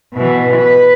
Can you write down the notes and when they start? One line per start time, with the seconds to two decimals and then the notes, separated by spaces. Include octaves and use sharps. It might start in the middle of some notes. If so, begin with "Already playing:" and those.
0.14 B2 E3
0.57 B4